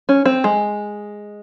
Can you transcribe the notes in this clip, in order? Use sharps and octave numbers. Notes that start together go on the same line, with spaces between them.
C#4
C4
G#3